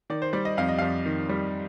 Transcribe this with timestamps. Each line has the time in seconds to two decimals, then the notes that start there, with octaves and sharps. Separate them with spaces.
0.10 D#3 D5
0.22 C5
0.33 G3 D5
0.45 D#5
0.57 F2 F5
0.68 D#5
0.78 F2 F5
1.06 D#3
1.29 G3